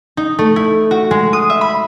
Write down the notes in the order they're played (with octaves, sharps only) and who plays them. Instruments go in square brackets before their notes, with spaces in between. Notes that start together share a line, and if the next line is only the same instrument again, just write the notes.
[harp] D#4
A3
E4
F#4
G#3
D#6
E5
B5